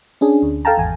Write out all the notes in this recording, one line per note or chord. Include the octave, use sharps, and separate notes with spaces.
C#4 D4 G#4
D2
A4 F5 G5 A5 A#5
G#1 E2 G#5